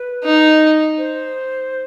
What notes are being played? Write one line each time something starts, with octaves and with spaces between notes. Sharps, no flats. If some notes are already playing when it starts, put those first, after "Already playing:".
Already playing: B4
D#4
C5